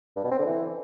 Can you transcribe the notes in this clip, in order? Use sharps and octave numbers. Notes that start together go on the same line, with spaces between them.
G2
B2
C4
D3
E3